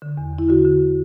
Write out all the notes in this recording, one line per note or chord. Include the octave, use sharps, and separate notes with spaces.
D3
E2
E2
E4
D3 F#4
D3